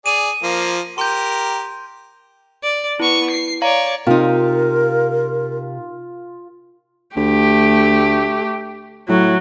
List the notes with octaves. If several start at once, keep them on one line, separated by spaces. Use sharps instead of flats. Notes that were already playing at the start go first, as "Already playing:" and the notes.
G#4 D5 D#7
F3 A#3
G4 A#4 C6 G6
D5
B3 E4 C#6
C7
C#5 D5 F5 A#5
C3 D#4 F4 A#4 F5
D2 A3 G4
A2 F#3